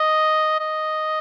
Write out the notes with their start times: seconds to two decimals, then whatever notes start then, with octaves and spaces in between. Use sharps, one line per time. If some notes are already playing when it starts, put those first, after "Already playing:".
Already playing: D#5
0.60 D#5